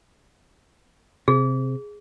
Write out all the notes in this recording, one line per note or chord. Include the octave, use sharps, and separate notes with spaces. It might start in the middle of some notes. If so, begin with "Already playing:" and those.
C3 G#4